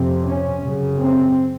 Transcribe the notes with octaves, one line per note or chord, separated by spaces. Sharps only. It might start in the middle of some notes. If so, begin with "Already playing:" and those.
Already playing: F2 C3 C4
C#4
F#2 C#3
C4